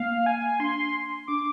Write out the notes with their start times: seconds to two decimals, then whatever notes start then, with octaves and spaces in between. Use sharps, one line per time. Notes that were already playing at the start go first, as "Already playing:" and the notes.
Already playing: A#3 F5
0.26 G#5
0.60 D4 C6
1.27 D4 D6